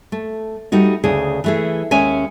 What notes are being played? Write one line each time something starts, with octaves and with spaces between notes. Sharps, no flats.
A3
G3 A3 D#4 F#4
D2 C#3 G#4
E3 A3 G#4
D#2 G#3 C#4 C#5 E5 G#5